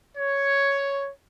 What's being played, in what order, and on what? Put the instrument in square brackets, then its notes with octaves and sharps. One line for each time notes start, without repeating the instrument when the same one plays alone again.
[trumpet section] C#5